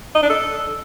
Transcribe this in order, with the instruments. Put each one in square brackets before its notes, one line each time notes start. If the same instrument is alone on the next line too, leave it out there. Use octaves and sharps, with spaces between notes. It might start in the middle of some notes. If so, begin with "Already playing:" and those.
[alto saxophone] D#5
D4
A4